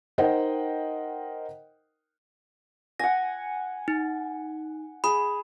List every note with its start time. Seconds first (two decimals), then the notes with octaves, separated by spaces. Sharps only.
0.18 D#4 A#4 C5 D#5 F#5 G5
3.00 F#5 G#5 A#6
3.88 D#4
5.04 G#4 B5